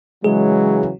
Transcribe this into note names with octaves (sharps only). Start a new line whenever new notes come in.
C#3 E3 F#3 G#3 G#4